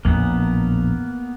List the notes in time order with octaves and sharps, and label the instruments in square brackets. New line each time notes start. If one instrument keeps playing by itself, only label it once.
[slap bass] A#1 [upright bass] E2 A2 [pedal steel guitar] A#3 B3